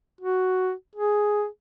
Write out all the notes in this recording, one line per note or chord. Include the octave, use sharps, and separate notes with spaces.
F#4
G#4